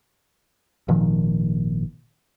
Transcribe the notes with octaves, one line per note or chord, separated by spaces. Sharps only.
G#1 A#2 D#3 F3